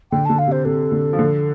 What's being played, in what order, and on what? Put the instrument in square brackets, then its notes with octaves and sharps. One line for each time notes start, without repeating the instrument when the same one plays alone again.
[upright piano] D3 [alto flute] G5
[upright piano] D3 [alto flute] A5
[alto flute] F5
[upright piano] C3 [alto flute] C5
[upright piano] C3 [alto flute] A4
[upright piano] D3
F3
D3